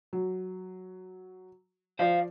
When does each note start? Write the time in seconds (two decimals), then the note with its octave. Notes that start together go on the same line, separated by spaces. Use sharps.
0.13 F#3
1.99 F3 F4 C5 D5 F5